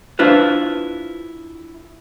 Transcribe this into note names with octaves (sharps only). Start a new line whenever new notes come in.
D4 E4 F4 B4 C5